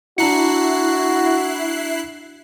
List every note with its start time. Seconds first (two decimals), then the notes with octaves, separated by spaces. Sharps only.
0.18 D4 E4 F#4 A#5 F#6 C7 C#7